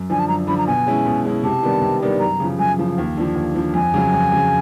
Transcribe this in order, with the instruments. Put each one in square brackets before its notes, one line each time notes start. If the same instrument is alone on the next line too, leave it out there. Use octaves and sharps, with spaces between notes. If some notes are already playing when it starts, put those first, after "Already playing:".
Already playing: [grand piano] F#2
[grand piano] D3 F3 [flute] G#5
[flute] A5
[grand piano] F#2 [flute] A#5
[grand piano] D3 F3 [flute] B5
[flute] A#5
[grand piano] B2 [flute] G#5
[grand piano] G#3 C#4 E4
B2
G#3 C#4 E4
[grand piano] C3 [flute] A5
[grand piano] D#3 G3 B3 D4
C3
D#3 G3 B3 D4
[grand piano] F#2 [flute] A#5
[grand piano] C#3 F3
[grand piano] F#2 [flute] G#5
[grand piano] C#3 F3
D#2
D3 F3
D#2
D3 F3
[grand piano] F2 [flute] G#5
[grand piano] C#3 F#3
F2
C#3 F#3